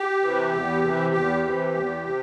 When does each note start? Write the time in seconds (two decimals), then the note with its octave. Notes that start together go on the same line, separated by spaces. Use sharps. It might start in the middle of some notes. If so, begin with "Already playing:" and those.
Already playing: G4
0.22 C3 E3
0.53 E2
0.83 C3 E3
1.14 E2
1.45 C3 E3
1.74 E2
2.06 C3